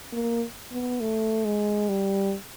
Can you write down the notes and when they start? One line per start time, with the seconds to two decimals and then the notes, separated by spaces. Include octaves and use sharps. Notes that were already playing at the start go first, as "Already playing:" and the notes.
0.13 A#3
0.72 B3
1.01 A3
1.45 G#3
1.89 G3